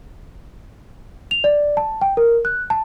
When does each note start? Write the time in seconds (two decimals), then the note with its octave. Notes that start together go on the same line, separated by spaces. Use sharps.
1.31 F7
1.44 D5
1.77 A5
2.02 G5
2.17 A#4
2.45 F#6
2.70 A5